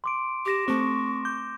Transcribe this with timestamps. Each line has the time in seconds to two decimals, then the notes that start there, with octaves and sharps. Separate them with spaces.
0.04 C6 D6 D7
0.46 G4 D6 A#6 E7
0.68 A3 C4 C#6
1.25 D6 G6